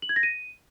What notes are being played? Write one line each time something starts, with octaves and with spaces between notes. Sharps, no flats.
F#7
G#6
A#6
D#7